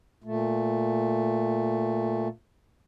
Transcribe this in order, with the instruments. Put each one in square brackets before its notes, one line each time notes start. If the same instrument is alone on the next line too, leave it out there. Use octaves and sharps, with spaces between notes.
[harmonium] A#2 A3